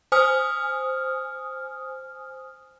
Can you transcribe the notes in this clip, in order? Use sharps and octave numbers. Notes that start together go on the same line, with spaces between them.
C5 G#5 D#6 F6